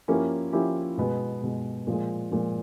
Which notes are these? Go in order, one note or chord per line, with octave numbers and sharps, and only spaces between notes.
F3 A#3 C#4 E4 G4
F3 A#3 C#4 E4 G4
B2 G#3 B3
B2 G#3 B3
A#2 F3 G#3
A#2 F3 G#3